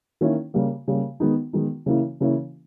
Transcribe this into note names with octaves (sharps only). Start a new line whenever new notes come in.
D#3 A#3 C#4 E4
C#3 G3 A#3
C#3 G3 A#3
D#3 G#3 B3 D#4
D#3 G#3 B3 D#4
C#3 E3 A#3 C#4 E4
C#3 E3 A#3 C#4 E4